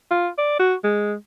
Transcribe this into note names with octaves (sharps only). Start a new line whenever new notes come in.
F4
D5
F#4
G#3